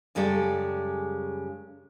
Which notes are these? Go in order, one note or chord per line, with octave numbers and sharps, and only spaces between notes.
F#2 C#3 G3 G#3 A4